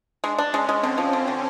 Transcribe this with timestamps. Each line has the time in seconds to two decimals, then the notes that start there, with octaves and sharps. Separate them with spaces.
0.24 G#3 D4
0.38 D4
0.53 G#3 C#4
0.69 G#3
0.83 D3 C4
0.98 F3
1.13 D3
1.28 D3